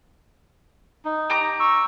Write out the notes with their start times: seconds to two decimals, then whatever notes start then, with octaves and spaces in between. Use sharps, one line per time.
1.05 D#4
1.30 G4 A#5 D6
1.60 C#6 E6